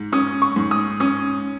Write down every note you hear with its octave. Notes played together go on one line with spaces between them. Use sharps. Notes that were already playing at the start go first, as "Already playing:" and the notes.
Already playing: G#2
C#4 D#6
C#6
G#2
D#6
C#4 D#6